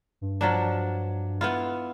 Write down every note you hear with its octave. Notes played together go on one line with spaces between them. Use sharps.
G2
F3 F#3 D4
B3 E4 F4